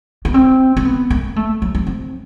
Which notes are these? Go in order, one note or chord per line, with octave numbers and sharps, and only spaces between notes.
B3
C4
C4
B3
A#3
A3
F#3
C4
C4